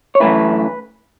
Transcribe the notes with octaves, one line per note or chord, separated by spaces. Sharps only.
C#5
F#2 E3 A3 E4 B4